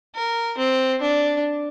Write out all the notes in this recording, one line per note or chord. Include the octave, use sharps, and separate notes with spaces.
A#4
C4
D4